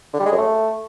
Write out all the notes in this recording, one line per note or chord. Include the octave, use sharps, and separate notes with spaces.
D3
G3
G#3
F#2
A3